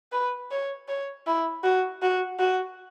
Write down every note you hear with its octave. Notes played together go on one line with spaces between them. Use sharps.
B4
C#5
C#5
E4
F#4
F#4
F#4